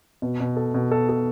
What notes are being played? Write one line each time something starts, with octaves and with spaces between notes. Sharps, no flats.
B2
B2
A4
B2
A4
A4